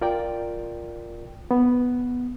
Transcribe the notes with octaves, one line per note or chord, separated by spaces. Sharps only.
F4 A#4 D5 G5
B3